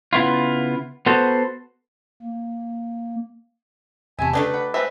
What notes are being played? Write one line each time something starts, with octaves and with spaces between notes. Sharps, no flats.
C#3 B3 E4 F4
B3 F#4 A4 C5
A#3
E2 C3 A3 E4 G#5
C#3 A3 D4 D#4 G4 B4
D5 F#5 B5
G#3 C4 B4 E5